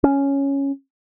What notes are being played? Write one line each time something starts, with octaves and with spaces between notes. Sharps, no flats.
C#4